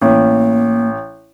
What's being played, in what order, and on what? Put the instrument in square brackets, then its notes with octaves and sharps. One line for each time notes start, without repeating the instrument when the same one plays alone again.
[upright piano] A1 [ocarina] A#3